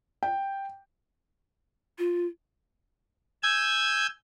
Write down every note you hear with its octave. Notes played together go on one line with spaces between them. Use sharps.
G5
F4
G#5 E6 G6 G#6